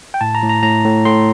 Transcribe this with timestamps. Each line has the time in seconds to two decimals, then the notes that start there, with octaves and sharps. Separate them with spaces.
0.14 G5
0.21 A2 A5
0.35 A#5
0.43 A2
0.49 A#5
0.63 A2 A#5
0.84 A2
1.05 A2 C6